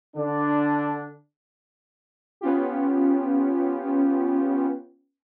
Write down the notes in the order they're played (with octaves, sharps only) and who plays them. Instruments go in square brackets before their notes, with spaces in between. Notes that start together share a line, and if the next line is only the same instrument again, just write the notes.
[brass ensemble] D3 D4
[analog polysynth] B3 C#4 F4 G4